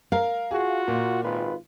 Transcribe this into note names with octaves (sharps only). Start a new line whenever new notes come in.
A#4 F5
F4 F#4 G#4
A#2
G#1 F4 B4